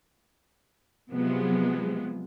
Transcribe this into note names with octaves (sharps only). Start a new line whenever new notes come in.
C3 F3 F#3 G#3 B3